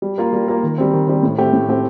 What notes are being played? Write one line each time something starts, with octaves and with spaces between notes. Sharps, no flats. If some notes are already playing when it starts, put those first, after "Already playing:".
G3
A#3 F4 A#4
G3
A#3 F4 A#4
D#3
G3 C4
D#3
G3 C4
A2
A3 C4 G4
A2
A3 C4 G4